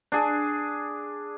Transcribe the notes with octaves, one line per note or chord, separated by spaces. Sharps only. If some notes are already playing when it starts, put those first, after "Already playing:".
D4 G#4